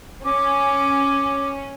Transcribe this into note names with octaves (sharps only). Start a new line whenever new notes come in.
C#4 D6